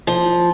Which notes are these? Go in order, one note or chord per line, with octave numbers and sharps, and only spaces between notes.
F3